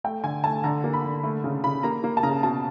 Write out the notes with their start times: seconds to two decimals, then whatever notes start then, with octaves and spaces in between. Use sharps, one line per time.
0.04 A3 G5
0.24 D3 G#5
0.44 A3 A5
0.63 D3 A#5
0.84 A#3
0.93 B5
1.04 D3
1.23 A3
1.44 C#3
1.64 C#3 B5
1.83 A#3 A#5
2.04 A#3
2.17 A5
2.23 C#3 A#5
2.43 B2 A5